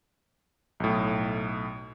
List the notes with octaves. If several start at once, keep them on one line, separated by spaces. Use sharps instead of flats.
B1 A2